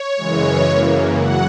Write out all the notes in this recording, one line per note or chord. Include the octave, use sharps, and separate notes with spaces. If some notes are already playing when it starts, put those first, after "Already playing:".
Already playing: C#5
F#2 C#3 E3 G#3
F#2 C#3 E3 A#3
F#3 F#5